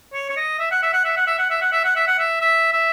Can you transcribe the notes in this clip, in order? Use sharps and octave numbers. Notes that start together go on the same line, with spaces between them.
C#5
C#5
D#5
E5
F#5
E5
F#5
E5
F#5
E5
F#5
E5
F#5
E5
F#5
E5
F#5
E5
E5
E5